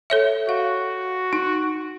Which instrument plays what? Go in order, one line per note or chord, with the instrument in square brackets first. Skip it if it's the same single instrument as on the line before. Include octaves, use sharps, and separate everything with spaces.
[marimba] A4 C#5 E5
[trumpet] F#4 [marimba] F5
[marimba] D#4